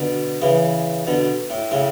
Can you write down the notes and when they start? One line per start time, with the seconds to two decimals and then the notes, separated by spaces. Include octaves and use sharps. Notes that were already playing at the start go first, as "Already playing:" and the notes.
Already playing: B2 D3
0.42 C#3 E3
1.07 B2 D3
1.50 A2
1.71 A2 C#3